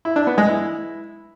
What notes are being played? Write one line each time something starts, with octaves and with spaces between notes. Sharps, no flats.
E4
D4
B3
G#3
E4